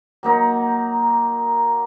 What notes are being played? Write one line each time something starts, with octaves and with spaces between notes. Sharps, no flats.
F#3 A#3 D#4